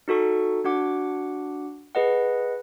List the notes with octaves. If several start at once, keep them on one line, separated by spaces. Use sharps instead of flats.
D#4 F#4 A4 C#6
D4 F#4 F#5 D6
G#4 B4 D#5 F#5